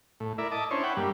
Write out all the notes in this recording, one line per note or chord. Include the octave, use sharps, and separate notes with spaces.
A2
E4 A#4 D5 E5
D#5 A5 D6
C#4 D4 E4 C5 C#5
B4 E5 F#5 G5
G2 G3 A#3